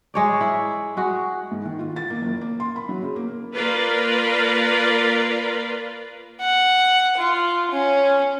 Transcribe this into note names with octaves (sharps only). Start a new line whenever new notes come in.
G#3 C#5 D5
E4
G#3 F#4
G#2
D#3
F4
A6
A#3
F#1
A#3
C6
B5
F#3
C#3
A#3
A#3 F4 A#4 B4 D5
F#5
F4
C#4